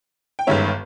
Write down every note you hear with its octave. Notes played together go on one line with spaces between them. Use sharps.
G5
G1 G2 D#3 G#3 C#4 C#5 E5